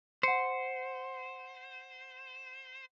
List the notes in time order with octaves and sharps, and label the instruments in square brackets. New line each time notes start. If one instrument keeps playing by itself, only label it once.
[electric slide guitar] C5 [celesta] F#5 C#7